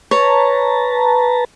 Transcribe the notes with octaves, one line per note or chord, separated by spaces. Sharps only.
B4 C#5 A5 A#5